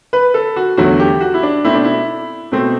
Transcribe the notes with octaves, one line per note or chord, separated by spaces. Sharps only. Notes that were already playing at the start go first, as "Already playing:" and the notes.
B4
A4
F#4
E2 D3 F#3 A3 F#4
G4
F#4
E4
D4
B2 A3 C4 E4
D4
E4
B2 A3 C4